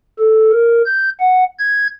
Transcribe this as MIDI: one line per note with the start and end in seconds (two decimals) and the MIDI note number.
0.19 0.52 69
0.52 0.82 70
0.86 1.09 91
1.20 1.44 78
1.59 1.88 92